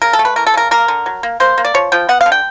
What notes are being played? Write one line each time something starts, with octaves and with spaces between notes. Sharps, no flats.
C#3 A#4
A4
A3
B4
E3 A#4
A4
C#3 A#4
A#3 A#4
D3
F#3
A#3
A#3 C5
A#3
D5
F3 C#5
F3 G5
B3 F#5
F5
D3
G5